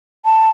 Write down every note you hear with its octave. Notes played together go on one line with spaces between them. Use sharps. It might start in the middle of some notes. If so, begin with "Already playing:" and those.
A5